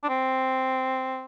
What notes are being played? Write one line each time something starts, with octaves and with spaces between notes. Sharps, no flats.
D4
C4